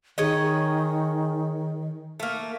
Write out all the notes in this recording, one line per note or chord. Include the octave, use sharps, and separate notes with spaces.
D#3 G#4 C#5 D#5
A3 A#3